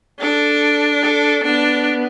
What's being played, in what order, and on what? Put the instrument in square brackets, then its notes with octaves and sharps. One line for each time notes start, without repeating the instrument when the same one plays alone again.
[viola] D4 [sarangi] A4
[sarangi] A4
[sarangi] B3 [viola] D4